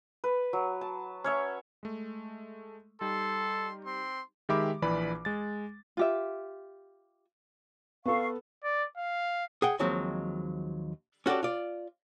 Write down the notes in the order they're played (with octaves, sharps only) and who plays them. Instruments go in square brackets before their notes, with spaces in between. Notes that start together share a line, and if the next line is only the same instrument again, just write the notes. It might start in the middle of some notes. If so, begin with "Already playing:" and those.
[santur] B4
F#3
A5
C#4 C#5 E5
[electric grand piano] G#3 A3
[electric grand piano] G3 D#4 G4 [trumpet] A4 [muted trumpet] C6
[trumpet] C4 [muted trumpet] C6
[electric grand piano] D#3 G#3 G4 E5 B5 D6
A#1 E3 B4 D5 B5
G#3 A6
[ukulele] F4 G4 E5
[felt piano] B3 A4 [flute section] F5 C#6
[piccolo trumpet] D5
F5
[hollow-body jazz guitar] G#4 F#5 G5
D#2 F3 F#3 G#3 C4
C#4 F#4 G4 A4 D5
F4 D5